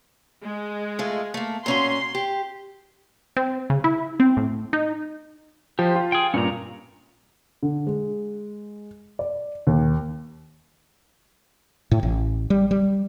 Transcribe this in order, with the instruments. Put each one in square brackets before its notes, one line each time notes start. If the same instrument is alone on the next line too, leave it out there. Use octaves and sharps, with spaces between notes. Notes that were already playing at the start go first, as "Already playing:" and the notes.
[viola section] G#3
[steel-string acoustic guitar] A3 F4 G#4
A3 A#3
[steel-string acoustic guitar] A#2 C#4 F#4 [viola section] C6
[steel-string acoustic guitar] G4
[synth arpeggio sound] C4
C#3
E4
C4
A2
D#4
[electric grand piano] F3 [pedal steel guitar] G4 C5
[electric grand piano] F4
[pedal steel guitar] G#4 G5
[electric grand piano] G2 A#2 [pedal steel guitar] C#4 A#5
[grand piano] D3
G#3
D5
D#2
[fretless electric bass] A2
A1
G3
G3